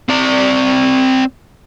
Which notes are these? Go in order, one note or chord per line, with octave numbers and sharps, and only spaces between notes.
C4 D5